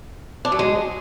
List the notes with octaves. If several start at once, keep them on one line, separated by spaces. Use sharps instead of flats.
D4
F#3
G#3